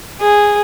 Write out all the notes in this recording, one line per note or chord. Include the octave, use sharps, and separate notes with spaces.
G#4